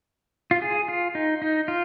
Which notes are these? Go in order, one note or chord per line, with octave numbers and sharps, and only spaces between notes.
F4
G#4
F4
D#4
D#4
F4